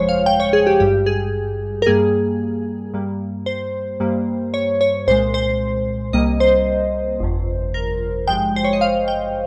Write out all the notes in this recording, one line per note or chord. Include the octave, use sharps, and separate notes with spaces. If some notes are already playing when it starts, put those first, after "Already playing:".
Already playing: G1 F2 C#3 F3 G#3 C5 C#5
F5
G5
C#5
G#4
G4
G#1 G2 G3 G4
G#4
A#4
G2 G3 A#3 G#4
G2 G3 A#3
C5
G2 G3 A#3
C#5
C#5
C2 A#2 G#3 C5
C5
C2 C3 G3 A#3 D#5
C5
G1 F2 C3
A#4
G#1 G2 F3 G#3 G5
C5
C#5
D#5
F5
G5